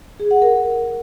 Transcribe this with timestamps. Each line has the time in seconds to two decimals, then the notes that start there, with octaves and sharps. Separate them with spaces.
0.20 G#4
0.31 F#5
0.42 A#4